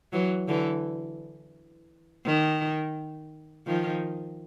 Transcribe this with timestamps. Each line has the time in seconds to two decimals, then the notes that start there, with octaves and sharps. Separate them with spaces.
0.13 E3 F#3
0.48 D3 E3
2.25 D#3
3.67 D#3 F3